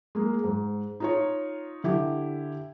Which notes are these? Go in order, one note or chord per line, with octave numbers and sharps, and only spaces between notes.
G#3 A#3
G#2
D#4 F4 C#5
D3 E4 G4